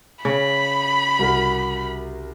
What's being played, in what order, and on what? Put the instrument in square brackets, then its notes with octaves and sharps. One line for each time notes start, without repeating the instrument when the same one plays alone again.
[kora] C#3 [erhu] B5
[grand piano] C2 F#4 A#4